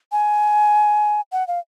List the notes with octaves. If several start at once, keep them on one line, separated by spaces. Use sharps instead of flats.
G#5
F#5
F5